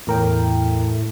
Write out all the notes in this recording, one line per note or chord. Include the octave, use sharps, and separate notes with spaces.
E2 A2 A#4 G5